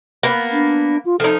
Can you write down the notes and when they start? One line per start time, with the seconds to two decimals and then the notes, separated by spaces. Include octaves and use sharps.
0.23 A#3 B3
0.52 D4
1.05 F4
1.20 F3 D#4 A4